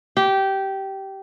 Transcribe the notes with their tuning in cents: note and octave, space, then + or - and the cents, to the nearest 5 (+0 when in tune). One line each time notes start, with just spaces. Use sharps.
G4 -15